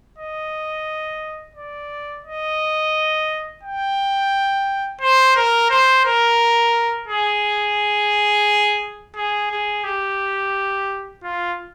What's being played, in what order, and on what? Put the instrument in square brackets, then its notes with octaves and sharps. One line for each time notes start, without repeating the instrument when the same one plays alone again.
[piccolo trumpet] D#5
D5
D#5
G5
C5
A#4
C5
A#4
G#4
G#4
G#4
G4
F4